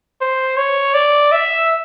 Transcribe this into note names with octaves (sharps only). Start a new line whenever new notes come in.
C5
C#5
D5
E5